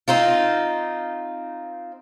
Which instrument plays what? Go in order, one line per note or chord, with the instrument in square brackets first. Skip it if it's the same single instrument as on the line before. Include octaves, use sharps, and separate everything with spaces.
[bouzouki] C4 D#4 F4